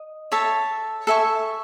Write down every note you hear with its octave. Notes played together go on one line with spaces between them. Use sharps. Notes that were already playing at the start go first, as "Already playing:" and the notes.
Already playing: D#5
A4 C#5 E5 A5
A4 E5 G#5 C#6